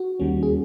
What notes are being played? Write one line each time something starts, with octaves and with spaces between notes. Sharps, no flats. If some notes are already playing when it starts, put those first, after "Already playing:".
Already playing: F#4
D#2 D#3 G3 A#3 C#4
G#4